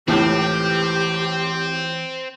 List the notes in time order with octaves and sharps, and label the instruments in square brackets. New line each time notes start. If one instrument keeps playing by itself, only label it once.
[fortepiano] C#2 A2 [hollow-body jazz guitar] E3 [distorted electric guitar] C4 [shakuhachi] G4